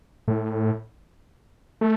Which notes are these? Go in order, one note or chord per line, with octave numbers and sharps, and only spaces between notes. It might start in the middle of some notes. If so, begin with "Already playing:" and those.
A2
A3